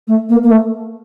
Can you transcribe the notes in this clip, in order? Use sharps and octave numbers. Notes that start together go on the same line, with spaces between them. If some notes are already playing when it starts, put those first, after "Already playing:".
A3
A#3
A#3
A3